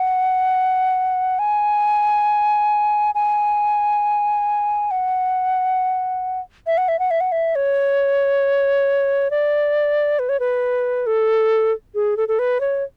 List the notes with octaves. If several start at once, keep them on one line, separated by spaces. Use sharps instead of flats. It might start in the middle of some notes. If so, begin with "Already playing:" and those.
Already playing: F#5
G#5
G#5
F#5
E5
F#5
E5
F#5
E5
F#5
E5
C#5
D5
B4
C#5
B4
A4
G#4
A4
A4
B4
C#5